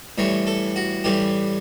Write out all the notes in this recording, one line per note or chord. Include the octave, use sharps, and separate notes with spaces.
A2 E3 G3 C#5
A4
F#4
A2 E3 G3 G4